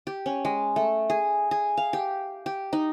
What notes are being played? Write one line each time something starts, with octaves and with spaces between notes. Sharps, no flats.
G4
C#4
G#3
A3
G#4
G#4
F5
G4
G4
D#4